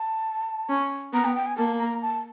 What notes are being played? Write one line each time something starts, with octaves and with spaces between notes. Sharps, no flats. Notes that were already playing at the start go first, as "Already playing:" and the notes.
Already playing: A5
C#4
B3 A#5
G5
G5
G#5
A#3 A5
A#5
A5